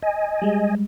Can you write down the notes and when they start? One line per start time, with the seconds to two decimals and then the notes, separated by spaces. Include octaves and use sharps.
0.02 D#5 G#5
0.42 G3 G#3